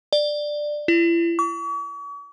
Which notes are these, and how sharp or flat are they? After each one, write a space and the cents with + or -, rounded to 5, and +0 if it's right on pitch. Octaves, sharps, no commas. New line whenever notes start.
D5 +15
E4 +40
C#6 +45